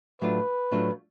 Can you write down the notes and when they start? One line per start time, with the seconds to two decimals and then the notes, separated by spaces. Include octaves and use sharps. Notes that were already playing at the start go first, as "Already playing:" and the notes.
0.21 A2 F#3 A3 D4 F4 B4
0.71 A2 F#3 A3 D4 F4